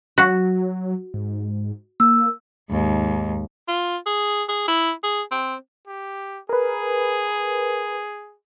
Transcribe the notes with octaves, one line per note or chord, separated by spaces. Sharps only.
F#3 F#4
G#2
A#3 E6
D#2 G#2
F4
G#4
G#4
E4
G#4
C4
G4
G#4 A#4 B4